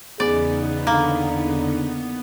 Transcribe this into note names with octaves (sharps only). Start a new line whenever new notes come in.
E2 C#3 B3 D#4 G#4 D5
D3 A#3